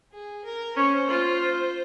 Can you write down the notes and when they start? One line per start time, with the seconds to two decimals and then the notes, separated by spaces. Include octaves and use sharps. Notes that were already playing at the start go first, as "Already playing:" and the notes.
0.12 G#4
0.45 A#4
0.76 C#4 C5
1.08 F4